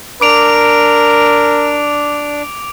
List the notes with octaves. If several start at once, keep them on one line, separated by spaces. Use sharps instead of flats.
D4 A#4 D6 D7 F7